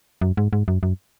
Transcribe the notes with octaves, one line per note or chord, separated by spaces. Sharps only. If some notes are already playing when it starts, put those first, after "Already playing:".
F#2
G#2
G#2
F#2
F#2